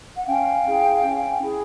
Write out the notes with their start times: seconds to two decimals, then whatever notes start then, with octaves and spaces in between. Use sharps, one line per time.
0.17 F#5
0.27 C#4 F5 G5
0.66 E4 G#4
1.03 C#4
1.42 E4 G#4